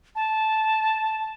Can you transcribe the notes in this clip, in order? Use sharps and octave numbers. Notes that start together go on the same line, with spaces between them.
A5